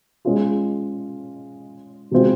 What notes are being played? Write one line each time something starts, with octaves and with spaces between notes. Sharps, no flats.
G#3 C#4 F4 G#4
C3 D#3 G#3 C4 F4